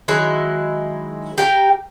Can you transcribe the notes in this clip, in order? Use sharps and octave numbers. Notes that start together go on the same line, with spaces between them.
D#3 F#3 G#3 E4
G4 A#4 F5 G5